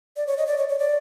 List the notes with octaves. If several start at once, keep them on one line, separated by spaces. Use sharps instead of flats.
D5
C#5
D#5
D5
C#5
C#5
D5